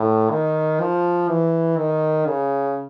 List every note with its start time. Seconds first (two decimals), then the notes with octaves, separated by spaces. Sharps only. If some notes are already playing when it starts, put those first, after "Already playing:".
Already playing: A2
0.31 D#3
0.80 F3
1.29 E3
1.78 D#3
2.27 C#3